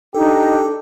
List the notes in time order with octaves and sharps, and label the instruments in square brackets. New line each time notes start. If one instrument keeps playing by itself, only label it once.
[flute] D4 [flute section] D#4 [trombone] G4 [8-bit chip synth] A4